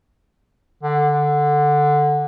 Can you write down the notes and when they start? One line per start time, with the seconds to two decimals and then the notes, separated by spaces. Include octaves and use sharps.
0.83 D3